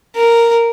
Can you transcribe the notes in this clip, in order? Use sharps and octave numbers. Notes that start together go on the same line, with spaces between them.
A#4